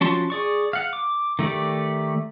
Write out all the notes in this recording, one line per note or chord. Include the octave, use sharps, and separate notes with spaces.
F3 C#4 F#4 A5 C6
G#4 D5 C#6
F5 F#5
D6
D#3 A3 G4 D5